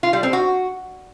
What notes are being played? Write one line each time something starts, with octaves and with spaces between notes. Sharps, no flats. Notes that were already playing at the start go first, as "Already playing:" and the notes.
F4
G3
C4
F#4